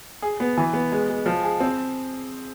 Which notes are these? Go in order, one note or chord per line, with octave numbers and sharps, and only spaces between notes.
G#4
B3
E3
B3
G#3
G#3
F3
G#4
C4